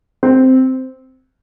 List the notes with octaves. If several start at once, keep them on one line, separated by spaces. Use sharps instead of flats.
C4